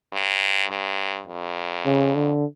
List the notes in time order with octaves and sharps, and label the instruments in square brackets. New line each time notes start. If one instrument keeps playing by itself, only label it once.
[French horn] G2
G2
F2
[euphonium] C#3
D3